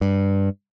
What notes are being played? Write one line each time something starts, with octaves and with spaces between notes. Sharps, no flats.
G2